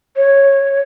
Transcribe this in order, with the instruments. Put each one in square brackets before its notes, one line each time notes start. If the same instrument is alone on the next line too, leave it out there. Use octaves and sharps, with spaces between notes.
[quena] C#5